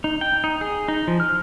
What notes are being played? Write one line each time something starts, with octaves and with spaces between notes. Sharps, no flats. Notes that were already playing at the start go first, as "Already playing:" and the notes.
D#4
G5
D#4
G#4
D#4
F3
F6